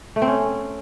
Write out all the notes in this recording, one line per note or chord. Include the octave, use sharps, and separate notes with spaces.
A3
C4
C#4